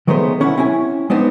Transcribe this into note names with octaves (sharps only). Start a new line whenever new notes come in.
D#3 F#3 G#3 A3 B3 C5
D3 C#4 E4 F#5
C4 C#4 E4 G#5
G#3 B3 C4 D4 D#4